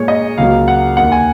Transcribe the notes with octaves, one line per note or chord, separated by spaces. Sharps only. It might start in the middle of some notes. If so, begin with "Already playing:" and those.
Already playing: A#2 G#3 C#5
D#5
C#2 C#3 F#3 A#3 F5
F#5
D#2 D#3 A#3 F#5
G#5